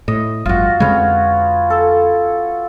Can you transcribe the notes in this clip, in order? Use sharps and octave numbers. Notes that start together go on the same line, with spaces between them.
A2 D#5
G1 F2 F4 F#4
F2 D3 G#3 C#4 B4 C#5
A4